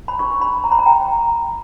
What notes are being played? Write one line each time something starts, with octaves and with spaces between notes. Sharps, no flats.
B5
D4 G4 B4 C#6
B5
A#5
B5
A#5
G5